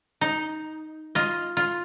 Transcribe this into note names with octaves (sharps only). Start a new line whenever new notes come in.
D#4
F4 D#5
F4